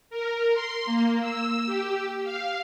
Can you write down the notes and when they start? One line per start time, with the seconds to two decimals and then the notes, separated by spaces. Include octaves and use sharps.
0.10 A#4
0.53 C6
0.85 A#3
1.20 E6
1.66 G4
2.24 F5